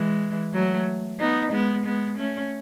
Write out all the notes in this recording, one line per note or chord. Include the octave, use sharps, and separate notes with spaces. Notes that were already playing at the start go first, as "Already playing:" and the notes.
Already playing: E3 G#3
F#3 A3
B3 D#4
G#3 B3
G#3 B3
A3 C#4